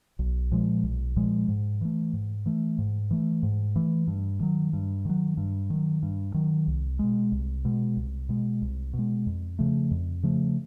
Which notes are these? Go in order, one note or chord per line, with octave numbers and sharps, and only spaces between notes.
B1
A#2 F3 G#3
B1
A#2 F3 G#3
G#2
E3 A3
G#2
E3 A3
G#2
E3 A3
G#2
E3 A3
G2
D#3 F#3
G2
D#3 F#3
G2
D#3 F#3
G2
D#3 F#3
C2
B2 G#3
C2
B2 G#3
C2
B2 G#3
C2
B2
G#3
F2
C#3 F3 A3
F2
C#3 F3 A3